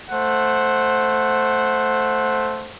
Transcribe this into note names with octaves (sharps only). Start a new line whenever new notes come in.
A3 C5 F#5